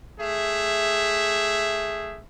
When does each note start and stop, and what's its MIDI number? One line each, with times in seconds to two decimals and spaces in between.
0.19 2.21 57
0.19 2.21 68
0.19 2.21 76